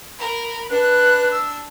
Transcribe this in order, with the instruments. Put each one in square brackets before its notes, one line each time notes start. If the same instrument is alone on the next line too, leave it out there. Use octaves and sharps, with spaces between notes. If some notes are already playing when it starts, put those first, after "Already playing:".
[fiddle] A#4 [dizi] B5
[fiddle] D4 [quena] B4 [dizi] F#6
[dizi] E6